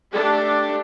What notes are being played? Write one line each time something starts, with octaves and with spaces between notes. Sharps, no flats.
A3 D4 G4 A4